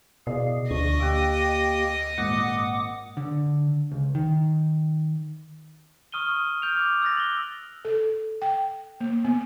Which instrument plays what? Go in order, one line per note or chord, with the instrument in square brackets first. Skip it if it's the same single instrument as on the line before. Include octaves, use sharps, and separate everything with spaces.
[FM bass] B2 [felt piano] E4 D5 D#5 [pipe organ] G#4 F5
[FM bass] D2 [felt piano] D4 [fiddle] D#5 [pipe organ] C#6
[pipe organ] A#3 G4 G5 [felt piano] E6 F#6
[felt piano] G#1 A#2 F#6 [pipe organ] F#5 D6 D#6
[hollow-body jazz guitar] D3
C#2
D#3
[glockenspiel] C#6 D#6 F6 D#7 G7
D#6
F6 G6 D7 F7
D6
E6 F#6 A6 A#6
F#7 G7
[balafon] A4
G5
A#3
B3